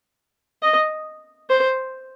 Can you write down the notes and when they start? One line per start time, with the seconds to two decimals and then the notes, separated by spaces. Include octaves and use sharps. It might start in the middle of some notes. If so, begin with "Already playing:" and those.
0.62 D#5
1.50 C5